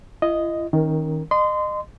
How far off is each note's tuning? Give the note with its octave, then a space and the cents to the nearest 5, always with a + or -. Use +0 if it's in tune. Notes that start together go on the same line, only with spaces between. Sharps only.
E4 +45 D#5 +0
D#3 +20 C#4 -10 A#4 +0
D#5 -30 C6 -25